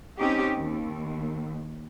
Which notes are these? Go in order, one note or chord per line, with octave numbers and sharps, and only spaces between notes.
C4 C#4 D#4 G4
D#2